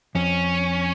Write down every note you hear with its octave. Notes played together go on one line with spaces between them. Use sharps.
F2 C#4